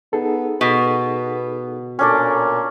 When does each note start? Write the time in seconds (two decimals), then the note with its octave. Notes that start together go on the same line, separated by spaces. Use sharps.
0.13 B3 D#4 G#4 A4
0.61 B2 B3
1.99 A#2 C#4 D4 A4 D5 C#6